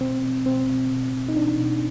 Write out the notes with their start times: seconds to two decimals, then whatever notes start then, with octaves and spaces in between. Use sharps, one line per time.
0.01 B2 C4
0.24 B2
0.46 B2 C4
0.68 B2
0.91 B2
1.14 B2
1.28 D#4
1.37 B2 D4
1.59 B2